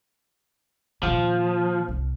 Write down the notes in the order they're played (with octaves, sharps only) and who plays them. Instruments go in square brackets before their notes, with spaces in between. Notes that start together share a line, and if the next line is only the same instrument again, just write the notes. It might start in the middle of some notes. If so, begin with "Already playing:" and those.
[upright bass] A#2 D#3 [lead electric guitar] F3
[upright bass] C2